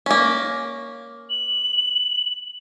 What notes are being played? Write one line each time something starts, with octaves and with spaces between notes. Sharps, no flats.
A#3 C#4
F#7